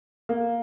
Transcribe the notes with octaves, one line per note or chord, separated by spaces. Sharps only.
A#3